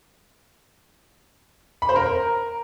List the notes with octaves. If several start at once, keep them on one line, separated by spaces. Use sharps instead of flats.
B5
C5
A#4